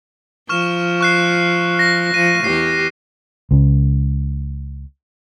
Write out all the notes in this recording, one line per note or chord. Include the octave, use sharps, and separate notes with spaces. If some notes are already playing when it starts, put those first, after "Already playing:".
F3 C#6 F6 E7
C#6 F#6 C7
A#6
F3 D#7
E2 G4 C7
C#2 C#3